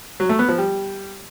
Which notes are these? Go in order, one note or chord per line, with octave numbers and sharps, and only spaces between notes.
F#3
A3
B3
F3
G3